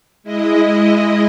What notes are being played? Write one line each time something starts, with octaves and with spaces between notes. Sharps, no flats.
G#3 E4 D#5